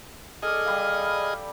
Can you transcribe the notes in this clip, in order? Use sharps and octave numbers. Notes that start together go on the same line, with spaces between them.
G#4 A4 D5 D#5 F6
G3 F5